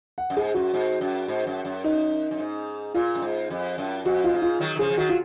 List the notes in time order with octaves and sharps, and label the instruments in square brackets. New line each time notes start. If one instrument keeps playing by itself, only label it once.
[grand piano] F#5
[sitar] F#2
[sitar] G#2 [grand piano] G#4
[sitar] F#2 [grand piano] F#4
[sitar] G#2
F#2
G#2
F#2
F#2
[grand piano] D#4
[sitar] F#2
G#2
[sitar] A#2 [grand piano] F4
[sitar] F#2
G#2
F2
F#2
[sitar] F2 [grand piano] F#4
[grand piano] F4
[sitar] G#2
[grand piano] F4
[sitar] D#3 F#3
D#3
[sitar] C#3 F3 [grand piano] G#4
[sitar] F3
[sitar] D#3 F#3 [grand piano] F#4
[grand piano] F4